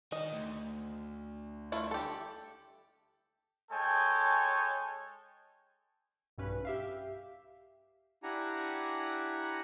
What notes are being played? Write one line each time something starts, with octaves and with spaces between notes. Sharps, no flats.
D#3 D#5
D2
A3 E4 F4
G4 A4
G#3 A4 C#5 G5 G#5
B1 G2 C#4 B4
G4 E5 F5
D4 E4 G4 F#5 G#5 A#5